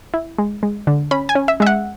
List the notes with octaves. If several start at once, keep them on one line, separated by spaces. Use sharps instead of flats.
E4
G#3
G#3
D3
C#4 B5
G#5
C#4
E5
G#3 E5
F#5